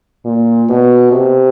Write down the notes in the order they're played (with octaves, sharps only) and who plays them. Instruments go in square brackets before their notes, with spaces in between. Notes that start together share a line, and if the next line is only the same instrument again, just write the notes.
[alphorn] A#2
B2
C3